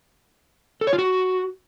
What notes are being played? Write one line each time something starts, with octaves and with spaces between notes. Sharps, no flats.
A4
C#5
F4
F#4